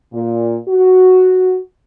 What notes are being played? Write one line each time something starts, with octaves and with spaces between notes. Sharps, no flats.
A#2
F#4